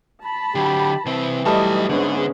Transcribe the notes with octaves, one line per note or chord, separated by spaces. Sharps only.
A5 B5
D3 F#3 G4
C2 E3 C4
F#3 G3 A3 D#4 B4 D#5 A5
D2 G#2 D3 B3 C#4 G#4